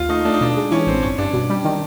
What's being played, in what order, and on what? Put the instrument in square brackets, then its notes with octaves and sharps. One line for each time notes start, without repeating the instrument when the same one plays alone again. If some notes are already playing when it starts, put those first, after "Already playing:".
Already playing: [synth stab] D#2 [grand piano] F4
[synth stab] A3 [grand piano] D#4
[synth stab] A3 [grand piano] D4
[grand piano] D#4
[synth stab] B2 [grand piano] D4
[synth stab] G#3
[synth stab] E3 [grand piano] C#4
[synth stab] A1 [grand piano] C4
[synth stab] G1 [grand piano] C#4
[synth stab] G2 [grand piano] D4
[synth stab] B2
G3
D#3